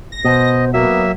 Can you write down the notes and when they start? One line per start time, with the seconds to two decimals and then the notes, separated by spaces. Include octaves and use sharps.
0.12 A#6
0.25 B2 C5 D#5
0.74 F#3 A#3 B3 E5